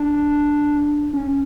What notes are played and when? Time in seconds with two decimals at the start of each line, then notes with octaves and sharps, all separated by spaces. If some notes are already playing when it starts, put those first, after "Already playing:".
Already playing: D4
1.13 C#4